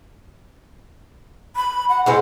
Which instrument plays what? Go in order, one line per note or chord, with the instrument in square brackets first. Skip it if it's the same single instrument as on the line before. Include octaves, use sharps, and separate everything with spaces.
[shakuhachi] B5
F#5
[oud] C3 E3 G#3 [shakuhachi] F#5